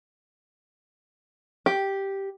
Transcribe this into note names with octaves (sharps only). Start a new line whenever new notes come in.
G4